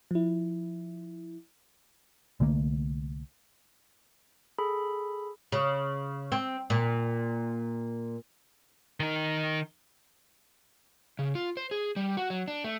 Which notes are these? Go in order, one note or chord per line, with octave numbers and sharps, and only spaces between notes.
F3 E4
C2 D3 A3 A#3
G#4 A4 B5
C#3
C4
A#2
D#3 D#4
C#3
F4
C5
G#4
G3
F#4
F#3
D4
A3